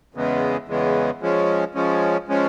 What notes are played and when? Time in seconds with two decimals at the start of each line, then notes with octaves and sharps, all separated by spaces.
0.14 E2 C#3 E3 G#3 B3
0.68 E2 C#3 E3 G#3 B3
1.21 F3 G#3 C#4
1.75 F3 G#3 C#4
2.28 F3 G#3 C#4